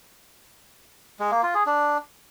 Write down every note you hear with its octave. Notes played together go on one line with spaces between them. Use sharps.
G#3
A#3
F4
G#4
D4